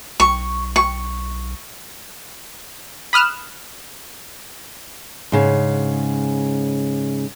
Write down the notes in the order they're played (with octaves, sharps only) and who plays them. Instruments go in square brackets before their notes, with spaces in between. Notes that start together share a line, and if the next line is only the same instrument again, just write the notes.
[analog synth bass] B1 [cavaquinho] C#6
[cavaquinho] C#6
[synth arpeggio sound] B5 D#6 F6 F#6 E7
[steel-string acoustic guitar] G#2 C#3